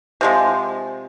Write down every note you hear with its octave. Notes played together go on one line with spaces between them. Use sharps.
C3 F3 G#3